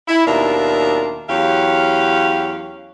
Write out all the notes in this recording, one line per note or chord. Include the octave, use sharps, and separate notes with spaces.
E4
D#2 B2 D4 F4 A#4 E5
E2 F#3 C#4 G4 F5